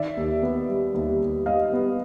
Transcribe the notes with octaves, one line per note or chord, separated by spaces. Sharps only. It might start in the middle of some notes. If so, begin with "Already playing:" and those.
Already playing: D#3 D5 E5
D#2
B3
G3
D#2
D#2
G3 D#5 F5
B3